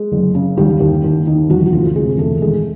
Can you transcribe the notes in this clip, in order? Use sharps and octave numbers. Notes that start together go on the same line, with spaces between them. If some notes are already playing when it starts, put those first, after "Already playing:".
Already playing: G#3 G#4
F#1
C#3
D#2 G3 G4
D#2
D#2
D#3
E1 F#3 F#4
F#4
D2 F3 F4
C3 G#3 G#4
E1 A3 A4
A4
G#1 G#3 G#4